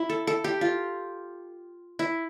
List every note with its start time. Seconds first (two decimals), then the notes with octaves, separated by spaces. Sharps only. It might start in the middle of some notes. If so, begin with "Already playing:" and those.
Already playing: E4
0.09 A4
0.27 A4
0.44 G4
0.61 F4
1.99 E4